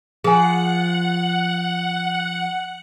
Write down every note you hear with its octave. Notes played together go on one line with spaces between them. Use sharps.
F3 G#4 F#5 G#5